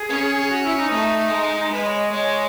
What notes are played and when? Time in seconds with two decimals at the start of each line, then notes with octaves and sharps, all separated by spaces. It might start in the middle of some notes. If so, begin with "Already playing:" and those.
Already playing: G#4
0.09 C#4
0.49 F#4
0.64 E4
0.77 D#4
0.90 A3
1.31 G#3
1.71 G#3 B4
1.84 C#5
1.98 D#5
2.11 G#3 C#5